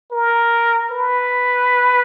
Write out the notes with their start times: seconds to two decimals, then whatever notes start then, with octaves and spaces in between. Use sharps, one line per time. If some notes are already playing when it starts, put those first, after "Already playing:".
0.12 A#4
0.91 B4